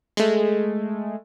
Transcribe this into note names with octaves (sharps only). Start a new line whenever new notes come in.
G#3 A3